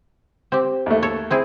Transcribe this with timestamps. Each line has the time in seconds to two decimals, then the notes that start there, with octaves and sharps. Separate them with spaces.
0.52 C4 G4
0.86 D#2 A3
1.03 A4 C#5
1.31 C4 E4 G#4